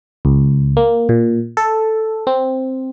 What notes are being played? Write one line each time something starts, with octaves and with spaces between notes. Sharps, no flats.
C#2
A#3
A#2
A4
C4